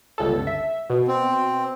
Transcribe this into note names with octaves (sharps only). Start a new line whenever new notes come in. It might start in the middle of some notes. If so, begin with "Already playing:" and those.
G1 C#2 A4
E5
B2
C4